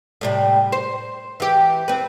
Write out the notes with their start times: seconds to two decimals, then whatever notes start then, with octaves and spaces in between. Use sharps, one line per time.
0.21 A2 C3 G3
0.72 C5
1.40 E3 G4
1.88 C4 B4